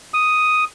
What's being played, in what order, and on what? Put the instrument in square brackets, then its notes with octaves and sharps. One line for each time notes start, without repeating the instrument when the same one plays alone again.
[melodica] D#6